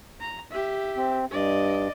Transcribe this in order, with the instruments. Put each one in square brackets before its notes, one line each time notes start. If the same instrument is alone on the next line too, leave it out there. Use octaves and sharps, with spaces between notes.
[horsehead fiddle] A#5
G4 E5
[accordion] C4
[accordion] G2 [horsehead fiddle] D5 D#5